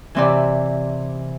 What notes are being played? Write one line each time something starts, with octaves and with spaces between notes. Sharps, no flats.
C3 E3 C4 D5